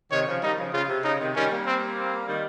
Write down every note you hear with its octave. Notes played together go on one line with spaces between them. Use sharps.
C3 D#3 C#5
C#3 F3
D#3 G3 D#4
C#3 F3
C#3 F4
C3
C#3 D#4
C3 D#3
D#3 G3 C#4
G3 A#3
C4
C4
D#3 G3